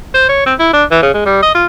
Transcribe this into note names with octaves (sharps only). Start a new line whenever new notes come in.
C5
C#5
C4
E4
D4
E3
C#3
G#3
G3
D#5
F4